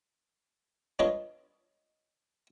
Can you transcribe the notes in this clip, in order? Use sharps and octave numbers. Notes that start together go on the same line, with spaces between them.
D4 F4 B4 C#5 D#5